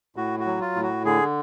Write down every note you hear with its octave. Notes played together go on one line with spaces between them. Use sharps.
A2 F#4
F#4
F#3
F4
A2
F#4
D3 G#4